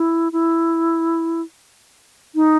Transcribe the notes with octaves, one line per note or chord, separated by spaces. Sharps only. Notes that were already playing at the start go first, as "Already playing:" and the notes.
Already playing: E4
E4
D#4